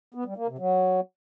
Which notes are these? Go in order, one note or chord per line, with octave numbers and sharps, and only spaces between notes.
B3
G3
A#3
C3
F#3